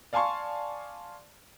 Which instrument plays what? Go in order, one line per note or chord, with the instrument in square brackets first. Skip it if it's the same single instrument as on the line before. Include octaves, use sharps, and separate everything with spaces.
[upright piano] D5 F5 G#5 A5 C6 C#6